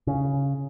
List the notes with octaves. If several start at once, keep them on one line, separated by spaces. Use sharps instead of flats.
C#3